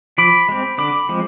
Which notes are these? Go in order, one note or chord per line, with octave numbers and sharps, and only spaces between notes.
F3 B5 D6
G#3 C4
D3 B5 D6
F3 G#3 C4